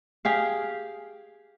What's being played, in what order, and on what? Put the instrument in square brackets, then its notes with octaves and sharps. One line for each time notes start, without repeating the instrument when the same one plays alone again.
[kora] G4 G#4 F5